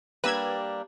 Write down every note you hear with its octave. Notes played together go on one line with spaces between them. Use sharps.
G3 A#3 D4 B4 E6 G#6